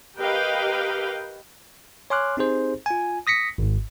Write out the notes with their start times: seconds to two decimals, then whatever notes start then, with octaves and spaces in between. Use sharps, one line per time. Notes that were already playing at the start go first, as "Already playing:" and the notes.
0.18 G4 A#4 B4 D#5 F5 G5
2.10 C#5 G#5 C6 D6 F6 F#6
2.37 C4 D#4 G4 G#4 C5
2.86 F4 G#5
3.27 D#6 A#6 B6 C#7
3.58 G#1 G#2